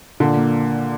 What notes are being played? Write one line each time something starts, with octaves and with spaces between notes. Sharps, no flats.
A#2 D3
A#3